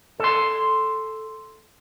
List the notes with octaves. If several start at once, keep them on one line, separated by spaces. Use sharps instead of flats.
A4 C6